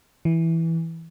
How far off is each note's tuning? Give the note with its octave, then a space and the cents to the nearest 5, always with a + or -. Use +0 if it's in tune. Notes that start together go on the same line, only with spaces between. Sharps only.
E3 -5